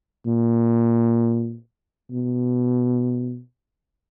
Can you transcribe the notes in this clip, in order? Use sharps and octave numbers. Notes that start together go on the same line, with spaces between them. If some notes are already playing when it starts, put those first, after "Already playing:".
A#2
B2